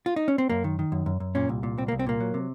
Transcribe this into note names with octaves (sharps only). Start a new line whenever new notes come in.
F4
D#4
C#4
C4
F#2 A#3
D#3
D#3
F#2
F#2
F#2
A#2 C#4
C2
A#2
C2 C4
A#3
C2
C4
A#2 A#3
F#3
C3